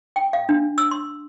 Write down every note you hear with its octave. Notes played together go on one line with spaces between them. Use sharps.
G5
F5
D4
E6
C6